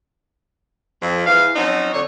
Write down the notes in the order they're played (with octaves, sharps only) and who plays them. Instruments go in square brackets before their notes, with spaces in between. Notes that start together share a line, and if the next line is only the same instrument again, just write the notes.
[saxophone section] F2
E2 E3 F5
F3 F#3 C4 C#4 D#4
F2 D3 C#5